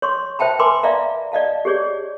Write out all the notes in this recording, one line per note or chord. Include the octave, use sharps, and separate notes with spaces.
C#5 C6 C#6
C5 E5 G5 A5 B5
A#4 B4 G#5 B5 C6 D6
D5 E5 F5 A#5
D5 D#5 F5 A5
G4 G#4 C#5 D5